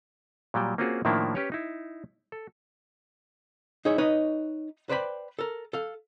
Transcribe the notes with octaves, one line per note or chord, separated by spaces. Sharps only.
A#2 F#3 G3 G5
A#3 C4 C#4 F4 F#4 G#4
A2 D#3 F3 A#3 D4 E4
C#4 G4 B4 C#5
D#4 E4
A4
D#4 E4 G#4 C#5
D#4 B4 C#5 D#5
B4 C5 D5 G5 B5
A4 A#4
A4 F5